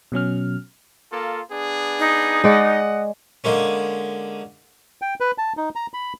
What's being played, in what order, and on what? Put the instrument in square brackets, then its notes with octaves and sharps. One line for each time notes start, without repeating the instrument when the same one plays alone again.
[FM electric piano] B2 F#3 C#4 F6
[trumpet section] A#3 F4 A4
B3 D4 G#4
[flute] D#4
[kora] G#3 D5 [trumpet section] D#5 F#5
[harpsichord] D3 G#3 A#3 C#4
[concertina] G5
B4
A5
D#4
A#5
B5